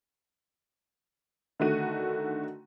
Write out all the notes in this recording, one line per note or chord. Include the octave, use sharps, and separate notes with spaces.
D3 D#3 A3 F#4 D#7